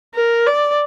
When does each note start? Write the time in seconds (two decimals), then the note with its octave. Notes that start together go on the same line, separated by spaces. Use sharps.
0.15 A#4
0.47 D5